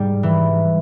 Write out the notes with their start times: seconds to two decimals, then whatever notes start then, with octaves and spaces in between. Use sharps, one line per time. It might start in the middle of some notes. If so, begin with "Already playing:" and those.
Already playing: G#2 G3
0.23 E3